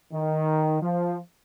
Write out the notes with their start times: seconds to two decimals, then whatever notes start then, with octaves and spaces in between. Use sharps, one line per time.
0.13 D#3
0.82 F3